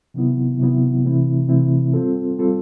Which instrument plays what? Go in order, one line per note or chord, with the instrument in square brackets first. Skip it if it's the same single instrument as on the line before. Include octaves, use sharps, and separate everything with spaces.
[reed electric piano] C3 D#3 F#3 B3 E4
C3 D#3 F#3 B3 E4
C3 E3 A3 C4 E4
C3 E3 A3 C4 E4
G3 C4 F4 A4
G3 C4 F4 A4